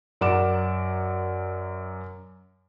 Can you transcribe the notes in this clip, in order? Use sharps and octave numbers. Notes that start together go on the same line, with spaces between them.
F#2 A#4 D5 F#5 D6 E7